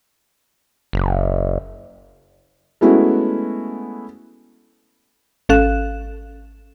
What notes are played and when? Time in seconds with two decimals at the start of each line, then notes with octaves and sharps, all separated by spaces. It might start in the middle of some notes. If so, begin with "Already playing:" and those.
0.93 F#1
2.81 G#3 A3 B3 C#4 E4 F#4
5.49 G#1 C#4 A4 F5 F#6 E7